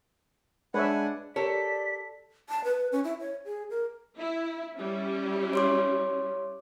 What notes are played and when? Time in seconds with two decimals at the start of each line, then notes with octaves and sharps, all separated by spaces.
0.74 G#3 D4 G#4 B4 C#5 E5 F#5 G#5
1.36 G4 A4 A#4 C#5 D5 B6
2.49 A5
2.64 B4
2.92 C#4
3.04 E4
3.20 C#5
3.45 G#4
3.70 A#4
4.18 E4
4.74 G3 C#4 E4
5.53 C#5 C6 D6